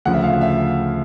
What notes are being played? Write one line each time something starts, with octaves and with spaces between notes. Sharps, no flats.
D2 C#3 F3 F#5
E5
F5
E5